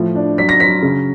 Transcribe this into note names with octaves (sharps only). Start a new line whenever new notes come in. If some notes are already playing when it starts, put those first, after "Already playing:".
Already playing: A2 F3
D4
F#3 B6
A#6
F#3 B6
C#3